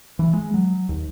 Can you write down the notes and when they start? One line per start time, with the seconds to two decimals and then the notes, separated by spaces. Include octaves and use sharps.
0.19 E3
0.33 G#3
0.54 F#3
0.89 D#2